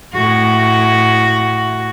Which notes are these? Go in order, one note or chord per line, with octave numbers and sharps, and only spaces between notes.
A2 F#4